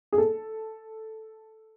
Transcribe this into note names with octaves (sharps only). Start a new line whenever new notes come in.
G#4
A4